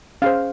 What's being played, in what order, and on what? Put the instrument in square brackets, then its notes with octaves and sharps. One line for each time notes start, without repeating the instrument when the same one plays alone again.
[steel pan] C#4 G#4 C5 F5